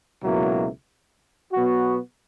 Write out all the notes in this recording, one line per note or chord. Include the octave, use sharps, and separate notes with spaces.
C#2 B2 F#3 A#3 E4
B2 F#3 B3 F#4